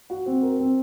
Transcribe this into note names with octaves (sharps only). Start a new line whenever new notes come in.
F#4
C4
A#4
C4